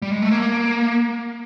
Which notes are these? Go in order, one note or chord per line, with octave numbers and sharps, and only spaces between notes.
G3
G#3
A3
A#3